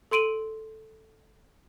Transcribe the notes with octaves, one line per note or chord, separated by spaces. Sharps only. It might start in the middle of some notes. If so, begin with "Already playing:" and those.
A4 C6 D7 D#7 F#7